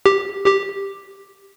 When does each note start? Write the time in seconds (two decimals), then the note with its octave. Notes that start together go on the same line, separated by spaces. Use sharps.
0.06 G4
0.46 G4